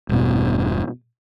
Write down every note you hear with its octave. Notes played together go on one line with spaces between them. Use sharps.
E1 G2 B2